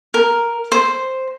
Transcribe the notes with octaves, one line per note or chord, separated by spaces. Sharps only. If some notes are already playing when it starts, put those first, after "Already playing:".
A#4
C5